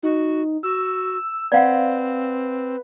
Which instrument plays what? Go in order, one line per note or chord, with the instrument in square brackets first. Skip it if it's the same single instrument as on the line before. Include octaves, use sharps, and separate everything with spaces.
[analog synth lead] D#4 [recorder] F#4
[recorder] F#4 [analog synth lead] E6
[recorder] C4 [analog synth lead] B4 [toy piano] D5 F5 F#5